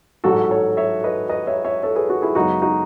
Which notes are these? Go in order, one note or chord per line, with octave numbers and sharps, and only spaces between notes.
A1 G#2 F#3 F#4 A4
A4 C#5
C#5 E5
B4 D#5
B4 D#5
C#5 E5
C#5 E5
A4 C#5
G#4 B4
F#4 A4
E4 G#4
F#2 C#3 G#3 B3 D#4 F#4
D#4 F#4